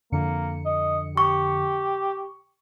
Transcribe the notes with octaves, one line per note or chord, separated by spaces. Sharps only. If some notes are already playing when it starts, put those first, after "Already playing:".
F2 D3 A#3 C#7
D#5
G4 C#6